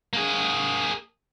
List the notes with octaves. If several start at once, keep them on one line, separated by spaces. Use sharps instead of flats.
A#3 G#4